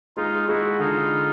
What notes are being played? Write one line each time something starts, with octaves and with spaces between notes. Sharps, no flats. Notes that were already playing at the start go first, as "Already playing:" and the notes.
G#3 D#4 F4
G#3 E4 F#4
D3 D#4 F4